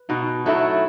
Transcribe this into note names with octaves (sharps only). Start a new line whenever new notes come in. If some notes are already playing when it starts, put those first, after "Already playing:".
Already playing: B4
B2 D#4 F#4
F#3 A3 D#4 E4 F#4